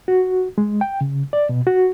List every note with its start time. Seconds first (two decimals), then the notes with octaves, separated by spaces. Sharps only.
0.08 F#4
0.58 G#3
0.81 G5
1.01 C#3
1.33 D5
1.49 B2
1.67 F#4